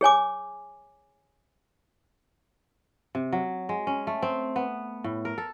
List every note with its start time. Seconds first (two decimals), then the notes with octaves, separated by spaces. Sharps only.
0.01 G#4 C#5 G#5 D6
3.15 C3
3.33 F#3
3.69 G#3
3.87 C#4
4.07 A3
4.22 C4
4.56 B3
5.04 A2
5.25 A#4
5.38 A4